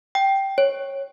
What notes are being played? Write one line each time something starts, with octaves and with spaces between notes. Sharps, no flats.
G5
C#5